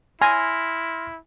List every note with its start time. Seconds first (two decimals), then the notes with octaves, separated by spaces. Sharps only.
0.21 E4 G#5 C6 F6 A#6